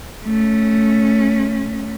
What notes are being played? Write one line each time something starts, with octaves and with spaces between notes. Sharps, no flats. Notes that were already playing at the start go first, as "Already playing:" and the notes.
A3 C#4